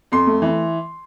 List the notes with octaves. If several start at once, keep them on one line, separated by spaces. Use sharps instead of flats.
F2 C6
A3
E3